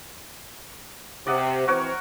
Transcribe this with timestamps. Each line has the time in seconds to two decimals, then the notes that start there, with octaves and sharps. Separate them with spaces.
1.27 C3 D5 D#5 F#5
1.68 E3 C4 F#4 A#4 C5 C#5